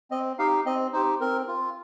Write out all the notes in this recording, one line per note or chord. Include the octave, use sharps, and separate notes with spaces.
C4 D#5
D#4 G4 F5
C4 D#5
D#4 G4 C5
C4 A#4
F4